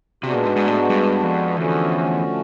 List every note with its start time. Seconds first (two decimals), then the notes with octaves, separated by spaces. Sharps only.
0.23 C3 G#3 B3 D4 F#4
0.34 A#2
0.45 G#2
0.56 G#2
0.68 A2
0.79 G#2
0.90 G2
1.23 F2
1.56 E2 D3 F3 A3 C#4 F#4